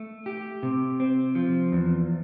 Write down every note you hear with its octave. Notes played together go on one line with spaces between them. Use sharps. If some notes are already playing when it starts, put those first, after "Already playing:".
Already playing: A3
G4
C3
C4
F3
E2